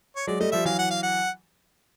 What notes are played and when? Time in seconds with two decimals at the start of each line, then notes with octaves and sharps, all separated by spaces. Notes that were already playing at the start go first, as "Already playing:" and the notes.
0.16 C#5
0.27 F#3 G#3 D5
0.40 G3 A3 D#5
0.52 F3 G3 E5
0.65 E3 F#3 F5
0.79 F#5
0.90 F5
1.03 F#5